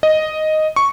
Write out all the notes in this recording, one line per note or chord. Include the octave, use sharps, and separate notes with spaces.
D#5
C#6